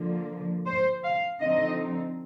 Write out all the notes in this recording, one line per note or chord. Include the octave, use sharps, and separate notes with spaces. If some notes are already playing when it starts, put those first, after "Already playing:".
Already playing: D3 F3 A#3
C5
F5
D3 F3 C4 D#4 D#5